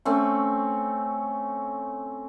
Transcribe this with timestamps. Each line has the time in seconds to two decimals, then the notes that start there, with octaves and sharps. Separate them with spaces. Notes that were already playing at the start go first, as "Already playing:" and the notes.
0.05 A3 C4 C#4